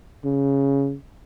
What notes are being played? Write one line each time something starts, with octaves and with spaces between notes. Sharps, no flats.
C#3